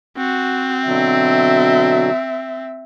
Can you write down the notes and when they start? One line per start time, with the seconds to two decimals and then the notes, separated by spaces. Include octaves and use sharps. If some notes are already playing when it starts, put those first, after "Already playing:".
0.17 C4 F#4
0.86 B2 D3 F#3 E5